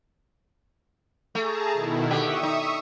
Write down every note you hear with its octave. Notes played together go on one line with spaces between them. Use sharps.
A3 G#4 A5 A#5
B2 D#3 E4
D3 G4 E5 C#6 D#6
D#4